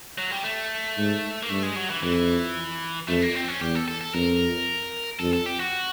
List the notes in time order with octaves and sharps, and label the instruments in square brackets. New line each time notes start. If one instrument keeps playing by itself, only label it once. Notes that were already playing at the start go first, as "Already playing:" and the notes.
[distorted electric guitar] F#3
G3
A3
[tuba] G#2
[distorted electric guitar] A#3
[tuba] G2 [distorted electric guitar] A3
[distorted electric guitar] G#3
F#3
E3
[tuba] F2 [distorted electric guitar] E3
[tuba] F2 [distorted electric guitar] A3
[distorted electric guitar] A#3
C4
C#4
[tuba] E2 [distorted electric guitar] G4
[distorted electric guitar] A4
A4
A4
[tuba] F2 [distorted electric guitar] A#4
[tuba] F2 [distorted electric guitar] A4
[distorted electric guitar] A4
G4
F#4